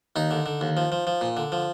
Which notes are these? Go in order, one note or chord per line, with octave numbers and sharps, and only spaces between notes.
D#2 D#4
D3
D3
D#2
F3
F3
F3
A#2
D3
F3